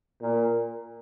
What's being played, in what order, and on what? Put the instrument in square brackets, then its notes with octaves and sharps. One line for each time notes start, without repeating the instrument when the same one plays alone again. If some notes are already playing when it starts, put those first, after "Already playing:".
[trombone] A#2